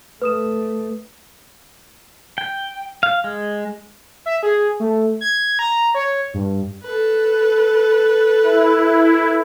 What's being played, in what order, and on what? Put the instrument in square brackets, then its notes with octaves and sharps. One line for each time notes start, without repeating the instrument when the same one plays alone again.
[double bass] A3 [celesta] B4 D#6 E7
[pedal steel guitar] G5
F5
G#3
[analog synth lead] E5
G#4
A3
G#6
A#5
C#5
G2
[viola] A4 B4
[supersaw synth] E4